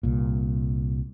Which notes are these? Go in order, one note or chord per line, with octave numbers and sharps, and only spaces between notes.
C2 A#2